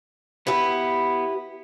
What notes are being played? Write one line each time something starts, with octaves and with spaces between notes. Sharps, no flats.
B3 E4 G4 B4